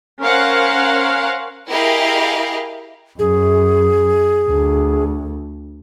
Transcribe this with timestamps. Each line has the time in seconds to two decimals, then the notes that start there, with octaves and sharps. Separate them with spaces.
0.22 C#4 A#4 C5 F5 F#5
1.68 E4 G4 G#4 A#4 D#5 F5
3.19 F#2 G#4
4.50 D2